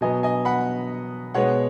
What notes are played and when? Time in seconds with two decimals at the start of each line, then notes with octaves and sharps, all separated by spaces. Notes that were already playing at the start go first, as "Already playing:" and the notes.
0.01 B2 F#3 B3 D#5 G#5
0.23 D#5 G#5
0.45 F#5 B5
1.34 B2 G#3 B3 C#5 F#5